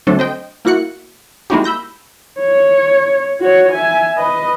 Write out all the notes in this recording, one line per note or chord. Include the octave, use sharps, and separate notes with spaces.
D3 F#3 A3 C4 D4 A4
C5 D#5 G5
A#3 E4 F#4 F#6 C#7
G#3 A#3 D#4 E4 F#4 G4
B5 E6 G6 A#6
C#5
F#4 C#5
E5 G#5
B4 D#5